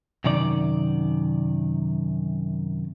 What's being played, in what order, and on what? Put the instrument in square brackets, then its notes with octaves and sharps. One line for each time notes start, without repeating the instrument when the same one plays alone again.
[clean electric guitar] F#2 C3 D#3 D5